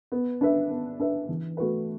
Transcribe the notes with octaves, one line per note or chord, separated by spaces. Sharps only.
B3
D4 B4 E5
B3
D4 B4 E5
E3
A3 F#4 B4